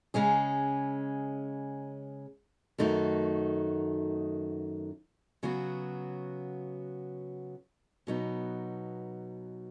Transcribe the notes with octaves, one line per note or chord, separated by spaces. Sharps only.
C#3 G#3 C#4 G#4
F#2 D#3 A3 D#4 F#4
C#3 F#3 B3 F#4
B2 F#3 B3 D#4